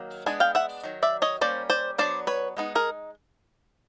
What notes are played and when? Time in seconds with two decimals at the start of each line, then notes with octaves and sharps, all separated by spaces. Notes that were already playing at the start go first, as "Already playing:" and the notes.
Already playing: D#3 F#3 A#3
0.26 G#3 B3 D4 G#5
0.40 F5 G5
0.55 E5 F#5
0.84 D#3 F#3
1.03 D5 E5
1.22 C#5 D#5
1.41 G3 A#3 C#4 C5 D5
1.70 C5 D5
1.98 F#3 B3 D4 C5 D5
2.27 B4 C#5
2.57 G#3 B3 D#4
2.75 G#4 A#4